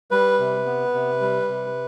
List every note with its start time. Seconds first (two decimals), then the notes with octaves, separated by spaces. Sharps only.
0.11 G3 B4
0.40 C3
0.66 B3
0.94 C3
1.21 G3
1.48 C3